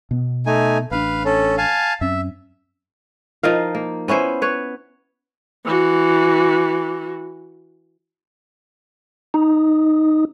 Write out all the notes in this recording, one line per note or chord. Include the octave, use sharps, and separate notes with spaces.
B2 B3
A3 D#4 G#5
A1 C4 D4 B4 F5
C#4 A4
F5 G#5 A5
F#2 C4 C#4 E5
F3 D#4 A#4 F5
A#3
B3 C#4 E4 C5
B4 C#5
E3 F#4
D#4